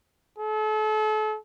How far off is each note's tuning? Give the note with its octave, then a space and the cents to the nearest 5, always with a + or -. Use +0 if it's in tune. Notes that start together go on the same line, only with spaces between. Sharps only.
A4 -40